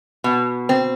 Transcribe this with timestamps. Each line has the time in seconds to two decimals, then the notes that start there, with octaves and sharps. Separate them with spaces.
0.24 B2
0.69 C4